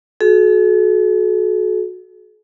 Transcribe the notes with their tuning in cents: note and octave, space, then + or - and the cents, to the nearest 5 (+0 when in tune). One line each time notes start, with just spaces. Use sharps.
F#4 -15 A4 -45